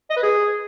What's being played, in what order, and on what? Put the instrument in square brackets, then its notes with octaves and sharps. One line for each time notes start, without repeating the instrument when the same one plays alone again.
[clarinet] D#5
B4
G#4